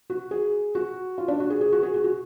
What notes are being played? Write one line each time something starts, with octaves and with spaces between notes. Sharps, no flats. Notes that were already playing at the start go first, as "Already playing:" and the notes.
F#4
G#4
F#4
F4
D4
F#4
G#4
G#4
F#4
G#4
F#4
F#4